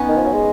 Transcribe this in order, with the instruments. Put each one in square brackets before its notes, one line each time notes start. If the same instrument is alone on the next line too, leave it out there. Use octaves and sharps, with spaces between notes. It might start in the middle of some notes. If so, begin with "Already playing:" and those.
Already playing: [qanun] B3 C#4 D#4
[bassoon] D#3
F3
F#3
G#3